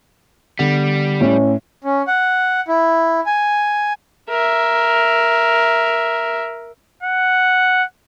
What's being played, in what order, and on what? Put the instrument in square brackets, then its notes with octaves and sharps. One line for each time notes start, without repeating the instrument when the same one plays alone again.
[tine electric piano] D3 B3 F#5 [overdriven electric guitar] G3
[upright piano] A2 [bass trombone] C#4
[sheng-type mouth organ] C#4
F#5
E4
G#5
[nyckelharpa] A#4 E5
[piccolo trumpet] F#5